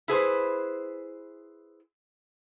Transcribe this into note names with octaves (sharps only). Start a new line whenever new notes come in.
E4 G#4 B4 C5